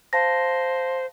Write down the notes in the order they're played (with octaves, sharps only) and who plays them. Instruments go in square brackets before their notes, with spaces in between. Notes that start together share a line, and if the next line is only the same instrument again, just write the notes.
[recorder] C5 [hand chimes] F5 A5 A#6